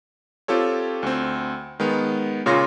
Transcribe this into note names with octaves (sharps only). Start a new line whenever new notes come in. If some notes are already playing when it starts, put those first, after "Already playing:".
C4 F4 G4 A4 C#5
D2 C4
D#3 G#3 B3
A#2 C#3 F4 C#5 C6 A#6